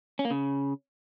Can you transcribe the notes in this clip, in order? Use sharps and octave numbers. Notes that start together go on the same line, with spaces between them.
C#4
A#3
C#3